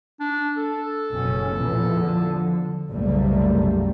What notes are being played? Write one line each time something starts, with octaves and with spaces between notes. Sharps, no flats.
D4
A4
F#1 B2 C#4
E2 A#2 F3
D3 F3
F#1 C2 G3 A3 A#3